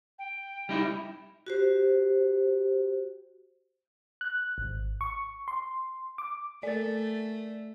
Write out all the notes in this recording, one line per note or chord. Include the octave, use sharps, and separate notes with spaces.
G5
G3 D#4 E4
F#4 G4 C5
F#6
G#1
C#6
C6
D6
A3 A4 A#4 D5 A6